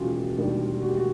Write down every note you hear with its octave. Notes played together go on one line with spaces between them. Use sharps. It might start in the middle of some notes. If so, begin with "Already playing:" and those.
Already playing: E1 D#2 C#3 E3 F4 F#4
E1 D#2 D3 G3
F#4
G4
F#4